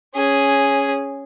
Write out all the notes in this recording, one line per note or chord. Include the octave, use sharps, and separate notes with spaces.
C#4 G#4